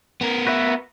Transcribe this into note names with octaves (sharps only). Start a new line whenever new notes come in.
B3 A#4
F#4 B4 E5